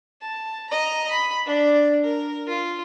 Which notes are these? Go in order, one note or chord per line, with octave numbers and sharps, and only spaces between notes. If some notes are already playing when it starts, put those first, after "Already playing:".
A5
D#5 A#5
B5
D4 D5
A#4
F4